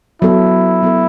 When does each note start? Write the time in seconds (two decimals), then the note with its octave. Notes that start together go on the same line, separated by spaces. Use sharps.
0.22 F#3 B3 E4 A4
0.82 F#3 B3 A4